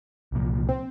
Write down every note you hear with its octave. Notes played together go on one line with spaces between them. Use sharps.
C2 A#2 F3
C4